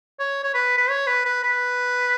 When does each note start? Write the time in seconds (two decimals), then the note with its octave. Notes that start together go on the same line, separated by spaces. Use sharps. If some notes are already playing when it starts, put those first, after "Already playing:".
0.19 C#5
0.44 C#5
0.54 B4
0.78 B4
0.90 C#5
1.07 B4
1.25 B4
1.43 B4